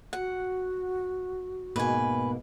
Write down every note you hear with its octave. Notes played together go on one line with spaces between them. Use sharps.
F#4 F#5
G#2 B2 A#3 B4 G#5